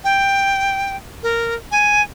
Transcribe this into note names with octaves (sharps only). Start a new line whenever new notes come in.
G5
A#4
G#5